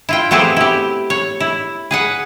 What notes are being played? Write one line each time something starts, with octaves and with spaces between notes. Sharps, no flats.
E4 F4 G5
A3 B3 C4 E4 G4 G#4
E4 G4
C#5
E4
G#4 B4 F#5